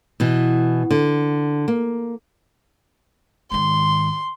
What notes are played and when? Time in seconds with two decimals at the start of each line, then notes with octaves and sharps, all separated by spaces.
0.20 B2 E3
0.91 D3
1.68 A#3
3.52 G#2 D#3 C6